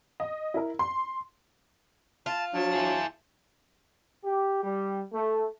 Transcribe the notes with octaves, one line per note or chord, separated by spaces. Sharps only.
D#5
E4 A#4
C6
F4 A5
F3 F#3 D4 A5
E4 G#4
G4
G3
A3